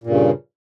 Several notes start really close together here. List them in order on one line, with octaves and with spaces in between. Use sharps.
A#2 G2 C#3